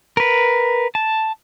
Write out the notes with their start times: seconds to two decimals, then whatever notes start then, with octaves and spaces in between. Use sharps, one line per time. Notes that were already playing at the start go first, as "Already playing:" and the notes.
0.17 A#4 B4
0.95 A5